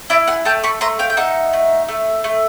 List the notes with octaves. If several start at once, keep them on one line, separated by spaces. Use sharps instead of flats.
E4 D5 E5
F#5 G#5
A3 G5 A5
B5 C#6
A3 A#5 C6
F5 G5
G5
D#4 E5 F#5
A3
A3
A3